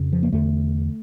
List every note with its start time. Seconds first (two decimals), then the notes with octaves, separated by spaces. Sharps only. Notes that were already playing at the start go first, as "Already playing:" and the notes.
Already playing: F2 C#3
0.12 F3
0.23 A#3
0.32 E2 D3 A3